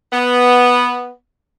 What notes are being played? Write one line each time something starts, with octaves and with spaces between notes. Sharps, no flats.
B3